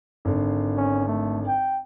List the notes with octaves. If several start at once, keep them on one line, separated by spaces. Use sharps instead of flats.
G#1 D3
C#4
A3
G5